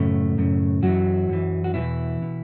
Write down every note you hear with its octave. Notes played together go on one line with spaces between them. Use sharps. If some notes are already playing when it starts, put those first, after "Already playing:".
Already playing: F#2 A2 C#3 A3
F#2 C#3
F#2 E3 F#3 F#4
F#2 E3
F#4
E2 B2 E3 E4
B2